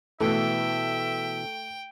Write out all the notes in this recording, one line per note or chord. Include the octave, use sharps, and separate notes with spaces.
B2 E3 A3 E5 G5